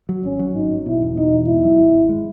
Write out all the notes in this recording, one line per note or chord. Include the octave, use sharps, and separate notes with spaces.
F#3
G#1 C#4
F#3
G#1 D#4
G#1
B2 E4
E1
B2 D#4
E2
G#2 E4
F#3
G#1
G#1
G#3